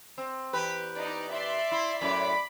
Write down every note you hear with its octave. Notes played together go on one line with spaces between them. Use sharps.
C4
E2 G4 B4
D#4 D5
D5 E5 C6
E4
F#2 A2 D5 B5 D6